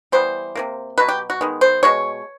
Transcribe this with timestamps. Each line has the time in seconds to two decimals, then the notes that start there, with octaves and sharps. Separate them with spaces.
0.12 E3 G3 B3 C5
0.55 C3 F3 A#3
0.98 B2 F#3 B4
1.08 G4
1.30 F#4
1.41 D#3 G#3 B3
1.61 C5
1.83 B2 G#3 C#5